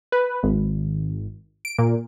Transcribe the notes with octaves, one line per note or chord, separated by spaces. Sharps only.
B4
G#1
D7
A#2